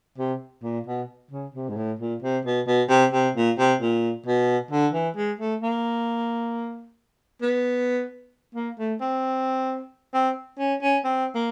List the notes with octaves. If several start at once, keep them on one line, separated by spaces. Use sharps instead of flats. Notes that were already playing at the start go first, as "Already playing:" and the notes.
C3
A#2
B2
C#3
C3
G#2
A2
A#2
C3
B2
B2
C3
C3
A#2
C3
A#2
B2
D3
E3
G#3
A3
A#3
B3
A#3
A3
C4
C4
C#4
C#4
C4
A#3